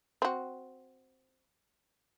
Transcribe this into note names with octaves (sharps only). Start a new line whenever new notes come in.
C4 F#4